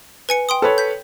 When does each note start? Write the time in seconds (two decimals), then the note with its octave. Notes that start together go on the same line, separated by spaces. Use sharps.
0.29 B4 G#5 C#7
0.49 G5 C6 D#6
0.62 A4 B4 C#5
0.78 G6 B6